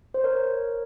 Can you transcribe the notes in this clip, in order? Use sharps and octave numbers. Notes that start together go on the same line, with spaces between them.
C5
A#4 C#5